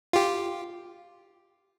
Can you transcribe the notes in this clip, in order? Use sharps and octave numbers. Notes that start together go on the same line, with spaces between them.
F4 G4